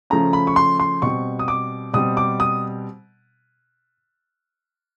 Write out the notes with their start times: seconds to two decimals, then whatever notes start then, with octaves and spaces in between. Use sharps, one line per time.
0.10 C#3 F3 A3 C#4 A#5
0.33 B5
0.47 C#6
0.56 C6
0.80 C6
1.02 B2 G3 C4 C#6
1.39 D#6
1.48 D6
1.93 B2 G3 C4 D#6
2.17 D6
2.40 D#6